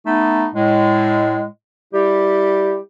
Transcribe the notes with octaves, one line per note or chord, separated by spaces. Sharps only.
A3 B3 D#4
A2 G#3
G3 E4 G4